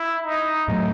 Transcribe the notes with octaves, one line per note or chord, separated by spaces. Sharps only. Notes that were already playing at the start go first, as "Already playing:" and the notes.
Already playing: E4
D#4
A2 F#3 A3